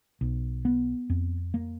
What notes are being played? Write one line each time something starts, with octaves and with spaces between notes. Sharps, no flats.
B1
B3
F2
A#3